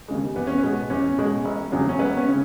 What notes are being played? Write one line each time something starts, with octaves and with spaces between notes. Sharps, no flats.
D#2 C#3 G#3
E2 B3
C#4
B3
B2 G#3
E2 C#4
B2 G#3
E1
E2 C#3 F#3
C#4
E1 B3
C#4
C#3